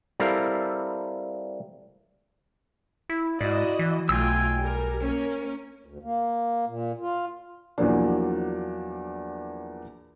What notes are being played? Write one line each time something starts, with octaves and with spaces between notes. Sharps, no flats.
G3 C4 E4 A4 A#4 F5
E4
G#2 E4 F#4 D5 D#5
E3
B1 A3 F4 G5 G#5 E6
G3 A#4
A#3 C#4 A#4
D2
A#3
A#2
F4
E2 F3 F#3 A#3 D4